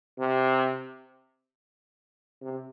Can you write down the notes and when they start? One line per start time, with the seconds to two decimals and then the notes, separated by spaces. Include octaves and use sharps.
0.19 C3
2.42 C3